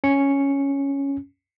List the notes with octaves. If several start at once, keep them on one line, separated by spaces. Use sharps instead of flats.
C#4 C#7